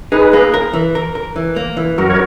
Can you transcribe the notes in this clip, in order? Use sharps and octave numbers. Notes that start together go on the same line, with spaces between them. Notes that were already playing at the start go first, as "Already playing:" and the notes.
D#4 G#4 B4
A#3
A#4
E3
A#4
A#4
E3
A#3
E3
F#2 F#4 A#4
C#5